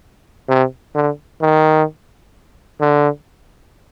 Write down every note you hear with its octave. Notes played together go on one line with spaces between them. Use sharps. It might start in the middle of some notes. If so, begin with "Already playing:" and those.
C3
D3
D#3
D3